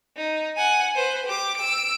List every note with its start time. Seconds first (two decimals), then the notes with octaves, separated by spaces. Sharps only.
0.17 D#4
0.57 F#5 G#5
0.95 B4 C5
1.26 G4 D6
1.57 E6 D7